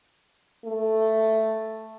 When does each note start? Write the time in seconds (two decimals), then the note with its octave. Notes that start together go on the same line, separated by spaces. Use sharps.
0.65 A3